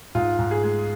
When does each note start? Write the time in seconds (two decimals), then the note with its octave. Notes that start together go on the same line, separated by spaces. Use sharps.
0.15 G#2 F4
0.39 G#2
0.51 G#4
0.63 G#3